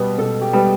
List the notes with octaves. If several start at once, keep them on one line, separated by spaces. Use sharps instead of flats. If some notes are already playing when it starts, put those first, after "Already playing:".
Already playing: B2 G3 B3 B4
B2 A4
G4
G3 B3